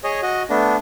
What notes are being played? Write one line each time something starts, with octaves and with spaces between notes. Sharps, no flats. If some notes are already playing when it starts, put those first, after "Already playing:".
G#4 C#5 D#5
F#4 D#5
A3 B3 D4